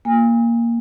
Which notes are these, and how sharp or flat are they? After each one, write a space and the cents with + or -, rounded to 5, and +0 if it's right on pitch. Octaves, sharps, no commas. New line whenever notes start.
A#3 +0 G#5 -35